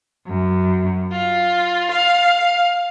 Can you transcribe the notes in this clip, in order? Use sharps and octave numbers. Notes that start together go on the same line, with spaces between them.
F#2
F4
F5